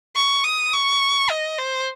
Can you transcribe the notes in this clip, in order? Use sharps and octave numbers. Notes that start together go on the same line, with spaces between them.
C#6
D#6
C#6
D#5
C5